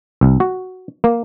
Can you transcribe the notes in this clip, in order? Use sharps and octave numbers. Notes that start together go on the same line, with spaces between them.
C2
F#4
A#3